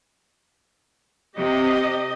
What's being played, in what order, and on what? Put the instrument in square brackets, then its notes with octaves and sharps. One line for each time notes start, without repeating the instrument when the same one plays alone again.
[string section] C3 [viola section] G4 D#5